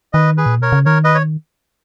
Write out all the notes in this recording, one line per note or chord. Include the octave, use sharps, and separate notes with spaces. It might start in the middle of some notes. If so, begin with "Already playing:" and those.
D#3 B4 D#5
G#4 B4
A#2
B2 A#4 C#5
C#3
D#3 A#4 C#5
B4 D#5
C#5